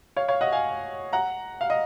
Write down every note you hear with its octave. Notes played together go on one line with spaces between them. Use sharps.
C#5 F5
C#5 F5
D#5 F#5
F5 G#5
F#5 A#5
F5
D#5